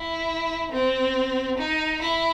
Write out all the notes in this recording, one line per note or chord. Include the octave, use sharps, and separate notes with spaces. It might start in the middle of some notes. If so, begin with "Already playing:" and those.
Already playing: E4
C4
D#4
E4